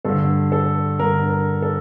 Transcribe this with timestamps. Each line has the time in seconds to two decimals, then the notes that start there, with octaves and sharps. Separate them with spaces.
0.05 G2 D3 A4
0.52 A4
0.99 G2 D3 A#4
1.30 A#4
1.62 A4